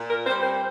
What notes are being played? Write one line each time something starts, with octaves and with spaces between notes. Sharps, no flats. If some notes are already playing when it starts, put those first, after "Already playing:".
Already playing: A#2
A#4
G3 C4 C5
C5